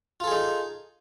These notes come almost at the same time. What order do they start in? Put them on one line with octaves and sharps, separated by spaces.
F4 A4 G#4 D#4